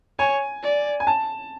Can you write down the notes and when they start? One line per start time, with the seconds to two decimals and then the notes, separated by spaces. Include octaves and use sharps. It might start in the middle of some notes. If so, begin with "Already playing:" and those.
0.19 C#5 G#5
0.63 D5
1.00 G#5
1.07 A5